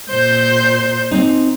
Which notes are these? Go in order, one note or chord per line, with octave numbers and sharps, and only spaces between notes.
A#2 C5 G6
C4 D#4